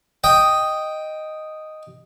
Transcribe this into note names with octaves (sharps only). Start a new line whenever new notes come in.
D#5 G5